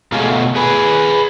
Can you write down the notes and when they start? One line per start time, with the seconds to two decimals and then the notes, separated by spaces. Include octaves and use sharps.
0.12 B2 A3 F4 G#4
0.56 G#4 B4